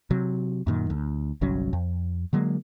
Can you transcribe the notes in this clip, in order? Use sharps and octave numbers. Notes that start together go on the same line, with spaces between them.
C3 F#3
F#2 A#2 D#3
D2
G1 C2 F#3 C#4
F2
D3 F#3 G#3 A#3